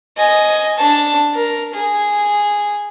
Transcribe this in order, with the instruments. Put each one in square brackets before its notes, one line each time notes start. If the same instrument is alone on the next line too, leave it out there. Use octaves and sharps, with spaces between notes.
[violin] D#5 G#5
D4 A5
A#4
G#4